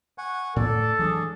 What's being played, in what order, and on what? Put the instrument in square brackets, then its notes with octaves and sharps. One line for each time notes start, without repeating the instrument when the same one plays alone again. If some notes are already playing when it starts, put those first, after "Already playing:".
[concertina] F#5 G#5 C#6
[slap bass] A2 [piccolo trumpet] A4 [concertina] D5
[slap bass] E3 F#3 G#3 [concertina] D4 G#4